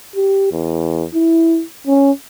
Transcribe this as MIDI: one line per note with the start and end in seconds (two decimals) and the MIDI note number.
0.16 0.47 67
0.52 1.04 40
1.14 1.63 64
1.87 2.12 61